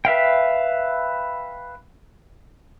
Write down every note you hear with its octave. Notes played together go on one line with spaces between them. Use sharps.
B4 E5 F5 G5